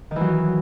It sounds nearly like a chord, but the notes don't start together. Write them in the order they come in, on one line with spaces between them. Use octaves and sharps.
D#3 E3 F#3